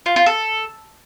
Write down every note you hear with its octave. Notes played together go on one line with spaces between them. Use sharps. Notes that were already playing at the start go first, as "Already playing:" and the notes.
F4
F4
A4